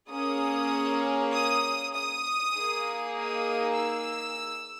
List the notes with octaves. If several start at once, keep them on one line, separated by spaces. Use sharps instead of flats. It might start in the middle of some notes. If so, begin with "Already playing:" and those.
A#3 C#4 G#4 D#6
D#6
D#6
A#3 D#4 G#4
D#6
E6